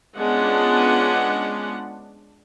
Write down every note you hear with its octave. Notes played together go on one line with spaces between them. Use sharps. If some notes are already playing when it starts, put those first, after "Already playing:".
G#3 B3 C#4 D4 F4 F#5